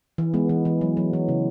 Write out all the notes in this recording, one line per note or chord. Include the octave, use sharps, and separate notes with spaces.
E3
G#3 B3
E3
E3
F#3
F#3
E3
C#3